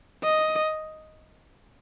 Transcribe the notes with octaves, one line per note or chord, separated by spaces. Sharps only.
D#5